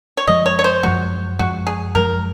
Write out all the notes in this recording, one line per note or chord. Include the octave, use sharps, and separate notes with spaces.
C#5
F#2 F3 G#3 D#5
C#5
C#5
C5
F#2 F3 G#3 F#4
F#2 F3 G#3 F#4
G#4
F#2 F3 G#3 A#4